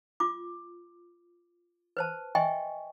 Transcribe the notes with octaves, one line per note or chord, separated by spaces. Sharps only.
F4 D6
B4 C5 A5
D#5 E5 G5 G#5 C6 C#6